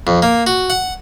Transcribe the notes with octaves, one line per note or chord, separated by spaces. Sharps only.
F2
A#3
F#4
F#5